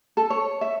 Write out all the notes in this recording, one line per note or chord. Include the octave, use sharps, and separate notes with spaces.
A4
C#5
E5